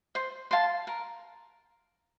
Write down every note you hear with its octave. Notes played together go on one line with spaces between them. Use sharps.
C5
F5 A5 C6
A#4